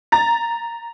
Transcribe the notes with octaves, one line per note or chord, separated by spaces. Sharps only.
A#5 A6